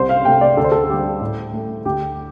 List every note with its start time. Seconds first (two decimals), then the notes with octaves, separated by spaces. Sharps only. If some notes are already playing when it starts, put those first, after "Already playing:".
Already playing: C2 C5
0.09 F5
0.25 C3 A3 G5
0.41 D5
0.57 D2 A4
0.64 C5
0.72 A4
0.89 D3 G3 G4
1.21 A2
1.53 A3
1.85 D2 G4